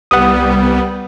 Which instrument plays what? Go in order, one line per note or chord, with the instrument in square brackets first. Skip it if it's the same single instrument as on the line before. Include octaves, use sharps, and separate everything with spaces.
[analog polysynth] C2 G3 B3 [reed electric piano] F#5 D#6